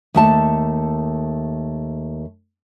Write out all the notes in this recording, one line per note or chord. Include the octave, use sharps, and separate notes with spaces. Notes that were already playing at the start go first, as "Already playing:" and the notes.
D#2 A3 A5